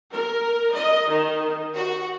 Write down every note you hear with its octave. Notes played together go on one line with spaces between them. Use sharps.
A#4
D#5
D#3
F#4